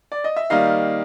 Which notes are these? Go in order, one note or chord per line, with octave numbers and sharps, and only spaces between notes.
D5
D#5
E5
D#3 G3 A#3 D#5 F5